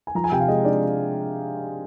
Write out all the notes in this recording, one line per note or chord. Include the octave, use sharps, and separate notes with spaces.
G#5
F3 A#5
G#5
C3 G5
F5
G#3 D#5
D4 D5